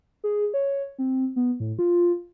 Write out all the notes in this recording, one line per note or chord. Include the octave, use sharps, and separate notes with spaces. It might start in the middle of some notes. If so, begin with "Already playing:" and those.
G#4
C#5
C4
B3
A2
F4